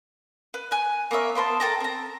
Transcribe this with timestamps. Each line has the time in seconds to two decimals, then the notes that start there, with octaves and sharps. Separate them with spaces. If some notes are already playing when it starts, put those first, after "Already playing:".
0.54 B4
0.71 G#5 F#6
1.11 A#3 B3 C#5 E5
1.35 A#3 B3 C5 A5
1.60 A4 G5 A5 A#5
1.80 C4 A#5